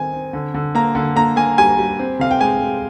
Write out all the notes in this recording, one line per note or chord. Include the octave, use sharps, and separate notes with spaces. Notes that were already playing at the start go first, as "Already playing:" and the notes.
Already playing: D#3 C4 G#5
C4
D3
D3
A#3 A#5
D3
A#3 A#5
A#3 G#5
G3 G#5
G3
C4
C3 F5
G5
G#3 G#5
G#3